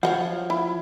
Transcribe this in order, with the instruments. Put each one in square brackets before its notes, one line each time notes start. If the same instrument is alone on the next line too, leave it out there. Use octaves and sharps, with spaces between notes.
[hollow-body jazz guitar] F3 [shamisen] C#5 D#5 F#5
[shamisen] E4